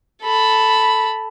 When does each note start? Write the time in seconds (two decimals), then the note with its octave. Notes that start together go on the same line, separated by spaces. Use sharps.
0.22 A4 B5